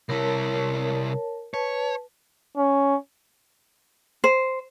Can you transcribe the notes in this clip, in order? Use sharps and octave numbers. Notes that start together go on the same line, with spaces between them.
C2 E4 A#4 C#5 A5
B4 C#5 A5
C#4
C5